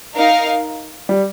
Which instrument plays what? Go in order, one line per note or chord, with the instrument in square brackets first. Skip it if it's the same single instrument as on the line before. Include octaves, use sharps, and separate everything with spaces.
[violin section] D#4 A#4 F5
[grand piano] G3